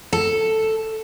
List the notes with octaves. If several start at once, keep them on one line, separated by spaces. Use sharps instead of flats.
A4